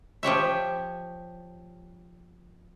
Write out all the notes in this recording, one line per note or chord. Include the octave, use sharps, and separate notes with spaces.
F3 G4 C#5 E5